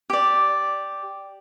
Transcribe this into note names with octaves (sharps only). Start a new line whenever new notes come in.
G4 D5